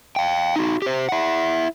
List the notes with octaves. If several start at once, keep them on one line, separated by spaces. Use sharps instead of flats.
F5 G5
D#4 F#4
G4 C5
E4 F#5